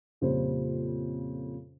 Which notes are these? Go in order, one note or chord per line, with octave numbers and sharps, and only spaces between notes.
F2 A#2 C#3 G3 C5